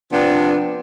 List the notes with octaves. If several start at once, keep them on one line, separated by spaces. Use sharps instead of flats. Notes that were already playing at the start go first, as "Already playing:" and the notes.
C3 F3 B3 D4